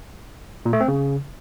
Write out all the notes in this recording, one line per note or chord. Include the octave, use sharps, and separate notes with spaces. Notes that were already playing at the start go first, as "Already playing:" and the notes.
A#2
A3
C4
C#3